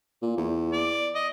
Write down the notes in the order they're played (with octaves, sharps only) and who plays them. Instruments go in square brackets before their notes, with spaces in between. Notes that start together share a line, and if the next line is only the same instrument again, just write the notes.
[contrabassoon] A#2
E2
[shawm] D5
D#5